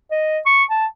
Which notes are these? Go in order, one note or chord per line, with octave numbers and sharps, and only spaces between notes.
D#5
C#6
A5